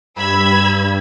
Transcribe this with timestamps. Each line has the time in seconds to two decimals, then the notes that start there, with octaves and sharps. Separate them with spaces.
0.16 G2 B5 E6 G#6